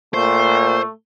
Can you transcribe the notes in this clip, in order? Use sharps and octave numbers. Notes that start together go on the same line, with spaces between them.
A#2 A3 C5